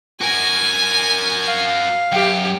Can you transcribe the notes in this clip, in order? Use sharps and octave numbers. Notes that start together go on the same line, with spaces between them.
F#4 A#4 G#5
F5
F#2 G4